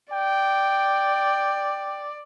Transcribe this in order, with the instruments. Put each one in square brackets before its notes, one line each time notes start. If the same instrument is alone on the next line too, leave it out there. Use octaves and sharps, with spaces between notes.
[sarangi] D5 [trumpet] G5